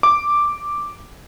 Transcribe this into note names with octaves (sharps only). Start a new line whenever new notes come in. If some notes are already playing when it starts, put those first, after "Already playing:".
D6